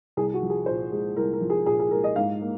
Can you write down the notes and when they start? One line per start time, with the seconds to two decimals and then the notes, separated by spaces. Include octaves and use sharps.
0.17 C2 G#4
0.34 F#4
0.42 F3
0.50 G#4
0.66 A#2 C5
0.92 G#3
1.16 C2 A#4
1.33 A#4
1.41 F3
1.50 G#4
1.66 A#2 G#4
1.80 G#4
1.91 G#3 A#4
2.04 D#5
2.16 G#2 F5
2.42 A#3